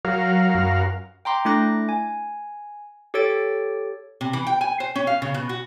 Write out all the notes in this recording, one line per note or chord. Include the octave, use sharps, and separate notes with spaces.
F#3 F#4 A#4 F5
F#2
G5 A#5 C6 D6
A3 D4 E4 D6 F#6 A#6
G#5
G4 A4 C#5 E6 A6 D7
C3
E3
G5
G#5
C5
C#4
F5
C#3
B2
F#4